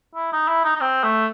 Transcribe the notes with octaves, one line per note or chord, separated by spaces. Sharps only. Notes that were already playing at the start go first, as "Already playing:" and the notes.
E4
D#4
E4
D#4
D#4
C4
A3